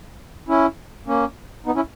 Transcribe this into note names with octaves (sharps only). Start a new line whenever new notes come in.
C#4 E4
A#3 C#4
B3 D#4
C#4 E4